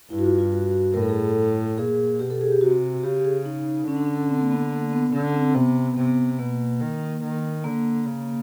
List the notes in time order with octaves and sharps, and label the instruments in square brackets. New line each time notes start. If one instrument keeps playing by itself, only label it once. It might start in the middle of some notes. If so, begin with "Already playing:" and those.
[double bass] G2 [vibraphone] E4
[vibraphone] F#4
F4
F4
F#4
[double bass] A2 [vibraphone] A#4
[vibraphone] A4
G#4
A4
[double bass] A#2 [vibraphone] G#4
[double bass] B2 [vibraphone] G4
[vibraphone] A4
G#4
G4
[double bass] C3 [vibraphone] F#4
[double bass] C#3 [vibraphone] G4
[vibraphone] G4
G#4
D#4
[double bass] D3 [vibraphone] C#4
[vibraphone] D4
C#4
C4
A#3
B3
A#3
B3
[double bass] D3 [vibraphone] C#4
[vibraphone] C4
[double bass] C3 [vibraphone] B3
[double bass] C3 [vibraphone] B3
[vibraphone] B3
[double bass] B2 [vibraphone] A#3
[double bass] D#3
D#3
[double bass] D3 [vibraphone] A#3
[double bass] C#3